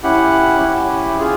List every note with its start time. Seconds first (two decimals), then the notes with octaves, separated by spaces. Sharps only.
0.03 C#4 E4 G4 F#5
0.60 C#4 E4 G4
1.18 F4 G#4